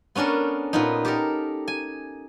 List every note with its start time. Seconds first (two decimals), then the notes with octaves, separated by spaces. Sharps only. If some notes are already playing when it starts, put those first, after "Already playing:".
0.15 B3 C#4 D4 A4 A#4
0.73 A#2 B3 D#4
1.05 G4 A4 A#4
1.68 G#5